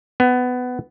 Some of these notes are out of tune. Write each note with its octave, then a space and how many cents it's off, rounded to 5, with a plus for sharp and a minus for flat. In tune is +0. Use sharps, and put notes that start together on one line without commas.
B3 +15